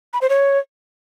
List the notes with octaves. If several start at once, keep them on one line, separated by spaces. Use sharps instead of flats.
B5
C5
C#5